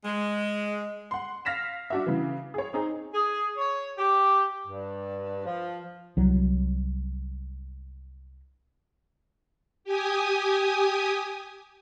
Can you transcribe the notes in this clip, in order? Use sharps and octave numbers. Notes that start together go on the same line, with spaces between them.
G#3
F#5 C6
F5 F6 A#6 B6 E7
D4 F#4 E5
C#3 E3
G#4 C#5
C4 D#4 G#4
G#4
C#5
G4
G2
F3
C2 F#3
G4 G#5 D#6